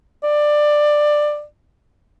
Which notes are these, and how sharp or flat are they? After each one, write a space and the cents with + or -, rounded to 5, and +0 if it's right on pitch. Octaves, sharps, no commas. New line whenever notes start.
D5 +15